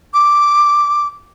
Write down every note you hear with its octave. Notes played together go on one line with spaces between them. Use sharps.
D6